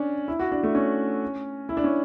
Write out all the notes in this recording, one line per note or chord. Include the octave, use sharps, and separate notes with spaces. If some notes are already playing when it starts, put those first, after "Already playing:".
Already playing: C#4 D4
E4
F#4
D4
A3
C#4
E4
D4
C#4